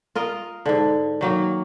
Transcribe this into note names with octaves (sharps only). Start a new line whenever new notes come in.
F4 A#4 D#5
G#2 D3
D#3 F#3 A#3